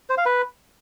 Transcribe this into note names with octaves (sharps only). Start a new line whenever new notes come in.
C5
F5
B4